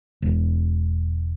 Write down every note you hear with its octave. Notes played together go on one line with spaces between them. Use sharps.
E1